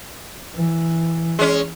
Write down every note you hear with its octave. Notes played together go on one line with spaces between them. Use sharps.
E3
G#3 C#4